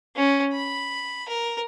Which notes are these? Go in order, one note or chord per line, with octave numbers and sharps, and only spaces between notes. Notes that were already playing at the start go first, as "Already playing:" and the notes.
C#4
B5
A#4